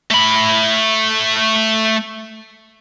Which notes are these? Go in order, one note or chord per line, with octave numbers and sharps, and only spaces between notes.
A3 B5